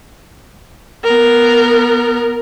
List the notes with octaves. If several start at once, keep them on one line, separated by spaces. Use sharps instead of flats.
B3 A#4